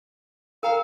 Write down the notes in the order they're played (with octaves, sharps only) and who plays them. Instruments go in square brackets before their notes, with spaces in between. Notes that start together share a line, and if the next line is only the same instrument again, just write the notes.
[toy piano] A#4 G5 A#5 [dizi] F5